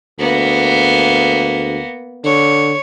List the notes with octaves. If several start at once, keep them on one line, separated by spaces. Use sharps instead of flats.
D2 A#3 B3
D3 C#5